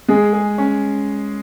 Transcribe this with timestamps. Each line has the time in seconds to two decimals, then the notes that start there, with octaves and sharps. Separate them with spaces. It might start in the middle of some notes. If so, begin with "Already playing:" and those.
0.09 G#3 G#4
0.33 G#4
0.58 C#4